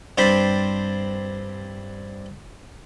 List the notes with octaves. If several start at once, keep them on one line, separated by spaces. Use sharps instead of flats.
G2 C4 D4 C5 A5 B5